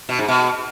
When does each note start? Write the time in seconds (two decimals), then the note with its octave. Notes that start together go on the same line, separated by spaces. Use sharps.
0.09 B2
0.19 G#2
0.28 B2